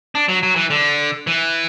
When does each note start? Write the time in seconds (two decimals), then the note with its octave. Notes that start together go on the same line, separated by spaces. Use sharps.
0.15 D4
0.28 F#3
0.43 F#3
0.56 E3
0.70 D3
1.27 E3